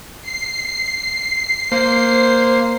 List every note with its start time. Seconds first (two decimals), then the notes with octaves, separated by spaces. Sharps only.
0.22 C7
1.72 A#3 C5